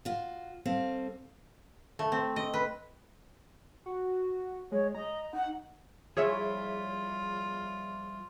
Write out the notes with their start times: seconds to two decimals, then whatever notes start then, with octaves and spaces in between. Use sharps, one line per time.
0.05 F4 F#4
0.65 G3 C4 A4 F5
1.99 A3
2.12 C4
2.36 D#5
2.54 B4
3.86 F#4
4.72 G#3 C#5
4.95 D#5 A#5
5.33 D#4 F#5
6.17 F3 G3 E4 F4 G#4 C#5 E5